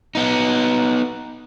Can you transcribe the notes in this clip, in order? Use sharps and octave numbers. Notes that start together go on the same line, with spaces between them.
B3 D#4